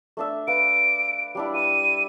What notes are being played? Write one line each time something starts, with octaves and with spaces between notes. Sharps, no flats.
A3 D4 E5
B4 F5 D7
G3 D4 E4
D6 D#7